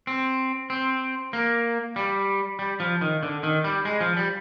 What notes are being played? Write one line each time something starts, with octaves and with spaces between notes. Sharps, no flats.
C4
C4
A#3
G3
G3
F3
D#3
D3
D#3
G3
G#3
F3
G3